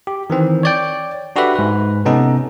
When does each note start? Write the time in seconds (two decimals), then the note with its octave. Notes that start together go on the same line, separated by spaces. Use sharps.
0.07 G4
0.30 D#3 E3 C4
0.63 C#5 D5 G5
1.36 D4 F#4 G4 A4 B4 E5
1.56 G#2 B4
2.05 C3 B3 C#4 D#4 A4